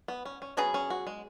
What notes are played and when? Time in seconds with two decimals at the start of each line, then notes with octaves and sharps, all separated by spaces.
0.08 B3
0.25 C#4
0.42 C#4
0.57 F#3 B3 C#4 G#4
0.74 C#4
0.90 F#4
1.07 G#3